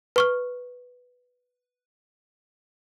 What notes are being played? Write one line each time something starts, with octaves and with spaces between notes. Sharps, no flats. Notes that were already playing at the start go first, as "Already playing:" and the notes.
B4 C#6 F6